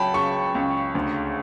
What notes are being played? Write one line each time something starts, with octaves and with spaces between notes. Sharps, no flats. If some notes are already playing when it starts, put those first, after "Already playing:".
Already playing: C#2 F#3 G5 A5 B5
C#3 C#6
C#2
D2